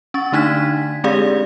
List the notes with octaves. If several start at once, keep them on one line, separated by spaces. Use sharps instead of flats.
C#4 C#6 A6
D3 A3 D4 D#4 G#6 B6
G#3 C4 G4 G#4 D5 F5